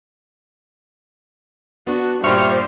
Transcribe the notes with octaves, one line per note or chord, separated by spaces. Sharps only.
B3 D4 F#4
G2 A#2 G3 C5 E5 C#6 F6